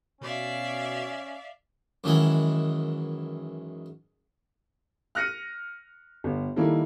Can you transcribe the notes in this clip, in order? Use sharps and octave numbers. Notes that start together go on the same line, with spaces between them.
B2 C#4 D5 E5 F5
F#2 D#3 E3 G#3 F#5
F6 F#6 A#6 C#7 D#7
G1
D#3 G3 A#3 D#4 E4 A4